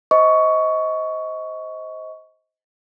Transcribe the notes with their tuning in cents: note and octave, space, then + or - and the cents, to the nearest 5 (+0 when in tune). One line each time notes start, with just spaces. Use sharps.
C5 +0 D#5 +25 C#6 +15